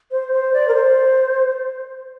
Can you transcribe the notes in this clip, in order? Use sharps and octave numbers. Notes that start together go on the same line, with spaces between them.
C5
C5
D5
A#4
C5